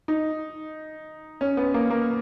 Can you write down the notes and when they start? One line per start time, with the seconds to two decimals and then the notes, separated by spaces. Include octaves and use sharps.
0.08 D#4
1.41 C#4
1.57 B3
1.74 A#3
1.90 A#3